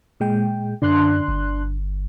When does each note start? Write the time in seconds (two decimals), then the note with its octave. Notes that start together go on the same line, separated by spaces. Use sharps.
0.20 A#2 G#3 G5
0.82 F#2 D3 D4 C6 F#6
1.28 G1